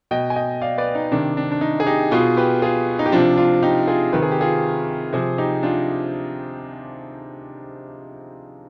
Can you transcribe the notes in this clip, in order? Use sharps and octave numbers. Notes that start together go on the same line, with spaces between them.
B2 D#5 G5
G#5
D#5 G5
D5 F5
B4 D5
D#4
C3 D#3 D4
D4
D4
D#4
G#4
D#4 G4
B2 F4 G#4
G4 B4
F4 G#4
D#4
G4
C3 F3 D4 F4
D4 F4
D#4 G4
F4 G#4
C3 D#3 B4
G#4
G4
F4 G#4
C3 F3 G#4 C5
D#4 G4
D4 F4